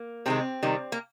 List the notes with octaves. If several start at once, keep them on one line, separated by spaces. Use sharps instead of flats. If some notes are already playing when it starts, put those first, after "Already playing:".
Already playing: A#3
C3 D#3 G#3 C4
C3 D#3 G3
A#3